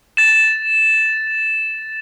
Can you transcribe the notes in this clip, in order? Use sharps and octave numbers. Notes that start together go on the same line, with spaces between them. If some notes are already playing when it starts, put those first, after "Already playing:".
A6 E7